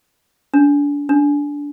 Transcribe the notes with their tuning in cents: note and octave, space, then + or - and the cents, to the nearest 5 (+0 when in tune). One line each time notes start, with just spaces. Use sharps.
D4 -30
D4 -15